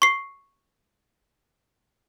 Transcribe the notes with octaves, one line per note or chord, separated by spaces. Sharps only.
C#6 C7